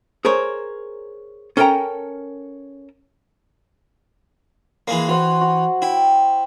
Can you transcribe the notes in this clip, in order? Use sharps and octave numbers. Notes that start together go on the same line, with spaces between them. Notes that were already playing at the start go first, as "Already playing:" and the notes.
G#4 A#4 C5 C#5
C#4 A4 A#4 C#5 G5 A#5
E3 G#3 A#3 B5
E3 F#4 C5 F#5
F#4
E4 G5